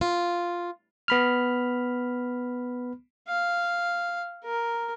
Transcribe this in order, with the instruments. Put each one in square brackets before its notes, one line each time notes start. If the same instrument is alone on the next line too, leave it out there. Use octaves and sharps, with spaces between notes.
[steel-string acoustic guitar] F4
[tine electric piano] B3 B5 F6
[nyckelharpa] F5
A#4